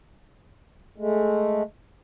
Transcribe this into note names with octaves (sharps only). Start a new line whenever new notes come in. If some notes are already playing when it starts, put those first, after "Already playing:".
G#3 A3